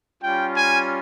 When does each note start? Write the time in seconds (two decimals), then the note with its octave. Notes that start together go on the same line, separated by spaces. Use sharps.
0.21 G3 C#4 F4 G5
0.55 G#5